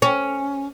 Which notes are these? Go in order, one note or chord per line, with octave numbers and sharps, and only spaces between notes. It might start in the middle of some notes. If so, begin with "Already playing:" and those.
C#4